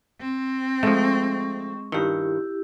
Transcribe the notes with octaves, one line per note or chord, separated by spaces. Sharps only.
C4
F3 G#3 A3 C#6
G2 D#3 E4 G4